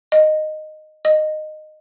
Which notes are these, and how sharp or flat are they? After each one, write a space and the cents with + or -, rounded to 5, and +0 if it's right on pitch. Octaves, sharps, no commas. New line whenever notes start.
D#5 -10
D#5 -15